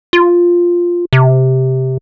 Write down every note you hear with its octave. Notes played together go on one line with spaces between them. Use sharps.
F4
C3